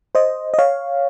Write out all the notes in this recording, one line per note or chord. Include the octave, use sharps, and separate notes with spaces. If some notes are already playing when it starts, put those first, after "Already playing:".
C5 D#5
D#5
C#5 F5